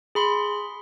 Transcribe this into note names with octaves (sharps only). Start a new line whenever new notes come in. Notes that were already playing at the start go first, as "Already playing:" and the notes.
G#4 B5 C6